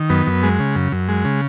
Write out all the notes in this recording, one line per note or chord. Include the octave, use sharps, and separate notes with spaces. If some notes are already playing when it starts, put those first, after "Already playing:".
Already playing: D#3
F#2 B3
F#2
G#3
C#3
F#2
F#2
G#3
C#3